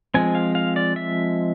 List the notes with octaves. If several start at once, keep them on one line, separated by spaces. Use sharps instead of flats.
F3 G#3 C4 G#5
F5
F5
D5
E5